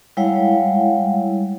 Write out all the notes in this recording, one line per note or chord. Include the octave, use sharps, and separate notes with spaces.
G3 G#3 E4 C#5 F5 F#5